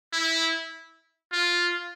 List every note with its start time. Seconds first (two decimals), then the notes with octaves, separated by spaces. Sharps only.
0.13 E4
1.33 F4